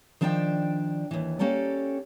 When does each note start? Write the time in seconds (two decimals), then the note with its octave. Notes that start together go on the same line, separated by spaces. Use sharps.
0.21 D#3 F3 D4 D5 G5
1.11 D#2 E3
1.39 A#3 C#4 G4 A4 D5